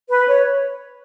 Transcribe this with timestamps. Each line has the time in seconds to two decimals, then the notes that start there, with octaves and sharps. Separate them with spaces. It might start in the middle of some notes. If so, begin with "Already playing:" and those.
0.08 B4
0.27 C#5